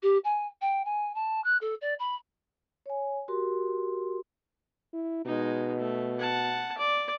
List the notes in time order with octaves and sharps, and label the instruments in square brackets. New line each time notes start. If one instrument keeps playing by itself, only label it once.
[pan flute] G4
G#5
G5
G#5
A5
F#6
A4
D5
B5
[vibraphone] C#5 G#5
F#4 G4 A#4 C6
[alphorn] E4
[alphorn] B2 [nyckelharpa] G#3 D#4
[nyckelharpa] A3
F#5 A5
D5